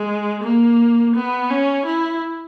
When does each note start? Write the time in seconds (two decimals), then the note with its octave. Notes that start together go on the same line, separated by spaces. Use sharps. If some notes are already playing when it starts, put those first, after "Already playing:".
Already playing: G#3
0.43 A#3
1.15 B3
1.50 C#4
1.85 E4